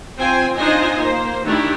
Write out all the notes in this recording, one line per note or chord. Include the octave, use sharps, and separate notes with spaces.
C4 F4 C5 G5 G#5
D4 D#4 F4 C5 D#5 G#5
A#3 C5
D#3 A3 D4 E4 G4